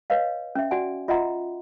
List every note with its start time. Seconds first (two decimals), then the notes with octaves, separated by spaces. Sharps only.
0.10 B4 C#5 D#5 F5
0.55 C#4 E5
0.71 F#4 D5 F#5 G#5
1.08 F4 D#5 E5 F#5 A#5 C6